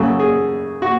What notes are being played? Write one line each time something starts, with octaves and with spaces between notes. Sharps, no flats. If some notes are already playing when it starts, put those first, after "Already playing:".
Already playing: F#2 C#3 F#3 A4
G#4
F#4